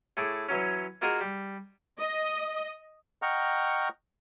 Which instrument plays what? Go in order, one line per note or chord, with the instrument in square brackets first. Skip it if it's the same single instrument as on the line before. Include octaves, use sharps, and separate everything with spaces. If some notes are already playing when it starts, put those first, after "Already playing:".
[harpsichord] A2 G#4 A4 A5 C#6 D6
E3 F#3 C#4
A#3 F4 F#4 G#4 A#4 D#5
G3
[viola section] D#5
[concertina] D#5 F#5 G5 A#5 C#6 F6